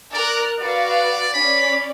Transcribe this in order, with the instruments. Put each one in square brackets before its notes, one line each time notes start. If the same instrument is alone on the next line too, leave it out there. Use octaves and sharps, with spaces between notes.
[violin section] A#4 F#6 [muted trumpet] D5
[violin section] F#4 B4 F5 [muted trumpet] D5
[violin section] C#4 D5 [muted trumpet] B5